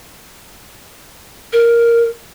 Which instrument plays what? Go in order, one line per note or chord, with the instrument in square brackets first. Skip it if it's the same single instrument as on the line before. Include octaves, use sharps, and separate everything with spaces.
[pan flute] A#4